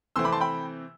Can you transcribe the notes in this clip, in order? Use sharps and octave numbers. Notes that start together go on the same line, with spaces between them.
C3 E3 A3 C4 C6 E6
B5 D6
A5 C6
G5 B5